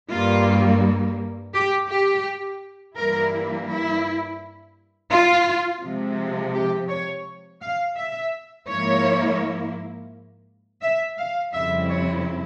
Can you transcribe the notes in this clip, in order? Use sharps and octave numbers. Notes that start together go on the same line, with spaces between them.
G2 G3 A#3 F4
G4
G4
G2 E3 G3 A#3 E4 A#4
E4
F4
C3 F3 G#3
G4
C#5
F5
E5
G#2 F3 A#3 E4 C#5
E5
F5
F2 C#3 G3 C4 E4 E5
C#5